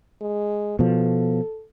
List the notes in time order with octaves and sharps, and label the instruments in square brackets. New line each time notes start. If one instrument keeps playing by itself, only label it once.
[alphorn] G#3
[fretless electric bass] B2 F3 [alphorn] A4